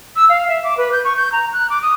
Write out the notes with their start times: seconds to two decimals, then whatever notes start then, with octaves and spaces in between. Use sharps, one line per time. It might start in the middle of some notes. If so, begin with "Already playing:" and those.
0.16 E6
0.29 F5
0.48 E5
0.64 D6
0.77 B4
0.92 G6
1.05 C#6
1.16 G6
1.32 A#5
1.53 F#6
1.70 D6
1.82 D#6